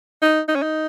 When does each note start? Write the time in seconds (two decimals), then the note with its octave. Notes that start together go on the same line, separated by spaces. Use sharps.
0.22 D#4
0.48 D#4
0.55 C#4
0.62 D#4